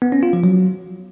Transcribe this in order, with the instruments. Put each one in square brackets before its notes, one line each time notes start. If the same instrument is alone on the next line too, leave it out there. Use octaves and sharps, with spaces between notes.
[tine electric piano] B3
C#4
F4
F3
F#3